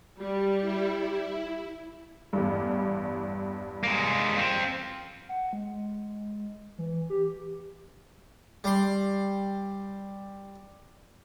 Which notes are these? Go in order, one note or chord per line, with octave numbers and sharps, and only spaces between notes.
G3
E4
A1 E2 G2
G#3 A#3
C4 F4
F#5
G#3
E3
G4
G3 C6